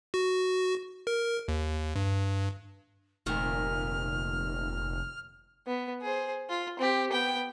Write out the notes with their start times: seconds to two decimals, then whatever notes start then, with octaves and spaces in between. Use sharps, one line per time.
0.14 F#4
1.07 A#4
1.48 D#2
1.96 G2
3.26 F1 A#2 D#3 A3 F6
5.67 B3
6.01 G#4 C5
6.50 F4
6.79 C4 G4
7.11 B3 G5